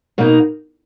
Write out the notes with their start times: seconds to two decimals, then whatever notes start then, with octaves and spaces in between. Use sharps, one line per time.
0.18 B2 A#3 D#4